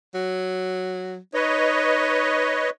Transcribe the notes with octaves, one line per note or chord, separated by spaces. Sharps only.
F#3
D#4 B4 C#5 D#5